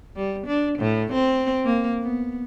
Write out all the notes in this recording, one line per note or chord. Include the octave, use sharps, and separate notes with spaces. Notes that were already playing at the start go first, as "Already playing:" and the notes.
G3
D4
A2
C4
A#3
B3